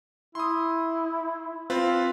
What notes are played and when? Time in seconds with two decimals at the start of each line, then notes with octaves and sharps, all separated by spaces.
0.35 E4 C6 D#6
1.70 C4 F4 B4